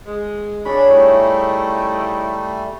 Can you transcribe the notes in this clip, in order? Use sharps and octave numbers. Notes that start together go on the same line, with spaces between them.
G#3
D3 D4 G#4 C#5 B5
G3 A3 C#4 D#4 E4